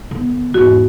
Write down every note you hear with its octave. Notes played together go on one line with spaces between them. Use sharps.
D3 B3
E2 G#2 F#4